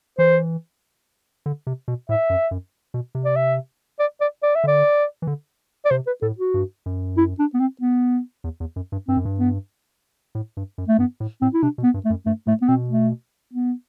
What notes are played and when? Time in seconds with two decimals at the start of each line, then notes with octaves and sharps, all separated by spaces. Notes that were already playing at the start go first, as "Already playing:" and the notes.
0.18 E3 C5
1.46 D3
1.67 C3
1.88 B2
2.09 A2 E5
2.30 F#2
2.51 F#2
2.94 B2
3.15 C3
3.25 D5
3.36 E5
3.99 D5
4.21 D5
4.43 D5
4.55 E5
4.64 D3 D5
5.22 E3
5.27 D3
5.85 D5
5.91 C3 C5
6.07 B4
6.22 A2 A4
6.38 F#4
6.54 G2
6.86 F#2
7.17 E4
7.39 D4
7.54 B3
7.60 C4
7.81 B3
8.44 E2
8.60 E2
8.76 F#2
8.92 G2
9.08 G2 C4
9.17 F#2
9.25 G2
9.39 B3
10.35 A2
10.57 G2
10.78 F#2
10.88 A3
10.98 G2 B3
11.20 A2
11.42 A2 C4
11.54 E4
11.62 C3 D4
11.78 B2
11.83 B3
11.94 G2
12.05 A3
12.10 F#2
12.26 G2 A3
12.47 A2 A3
12.62 B3
12.68 B2 C4
12.90 A3
13.53 B3